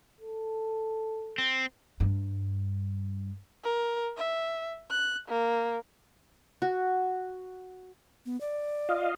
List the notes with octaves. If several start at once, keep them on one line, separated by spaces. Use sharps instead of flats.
A4
C4
G2 D4
A#4
E5
F#6
A#3
F#4
B3
D5
F4 D#5 F5